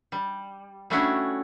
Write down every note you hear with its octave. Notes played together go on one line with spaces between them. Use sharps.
G3
G3 A3 C#4 D4 E4 F#4